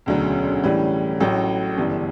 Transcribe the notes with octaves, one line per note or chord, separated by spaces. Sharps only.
E1 D2 C#3 F#3 C#4
A2 E3 G3 C#4
A1 A2 F#3 A3
G1 F#2 C#3 E3 G3